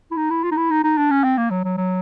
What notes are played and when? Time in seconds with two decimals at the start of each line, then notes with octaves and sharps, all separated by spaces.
0.11 E4
0.17 D#4
0.30 E4
0.44 F4
0.51 D#4
0.57 E4
0.71 D#4
0.84 D#4
0.98 D4
1.11 C#4
1.24 C4
1.38 A#3
1.51 F#3
1.64 F#3
1.77 F#3